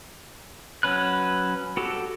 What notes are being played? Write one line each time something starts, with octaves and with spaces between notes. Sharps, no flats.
F#3 C#4 B4 F#6
F#4 G4 A4